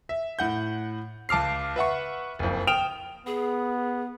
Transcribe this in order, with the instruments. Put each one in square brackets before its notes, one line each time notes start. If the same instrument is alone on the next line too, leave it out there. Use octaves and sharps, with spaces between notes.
[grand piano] E5
A2 F#5 G6
C#2 A5 D6 F6 C7
B4 E5 F#5 C#6
F#1 F2
G5 D#6 F6 D7 E7 F7
[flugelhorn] B3 [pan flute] G#4